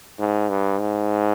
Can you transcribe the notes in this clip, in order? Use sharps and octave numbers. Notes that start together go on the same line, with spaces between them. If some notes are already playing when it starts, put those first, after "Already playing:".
G#2
G2
G#2